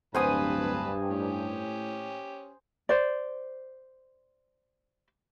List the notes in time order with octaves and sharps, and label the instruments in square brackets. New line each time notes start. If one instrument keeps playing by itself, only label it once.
[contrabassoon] D1 [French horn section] G2 [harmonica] B4 A5 B5 [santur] C5 G#5 D#6
[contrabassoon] A2 [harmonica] C#4 G4
[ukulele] C5 D5